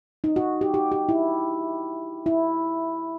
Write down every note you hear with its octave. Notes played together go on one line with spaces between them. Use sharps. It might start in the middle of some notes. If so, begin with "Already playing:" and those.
D#4
F#4
G4
G4
G4
E4
E4